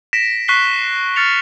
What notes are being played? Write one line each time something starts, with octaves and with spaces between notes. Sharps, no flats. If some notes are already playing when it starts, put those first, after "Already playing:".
A#6 B6 D7 E7
C#6 F#6 B6 C7 G7
F6 A6 C#7 F7